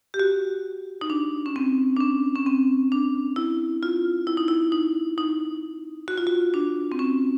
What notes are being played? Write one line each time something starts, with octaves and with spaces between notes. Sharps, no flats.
G4
F#4
D#4
D4
C#4
C4
D4
C#4
C#4
C4
D4
E4
F4
E4
D#4
E4
D#4
D#4
F#4
F4
F#4
D4
C4
C#4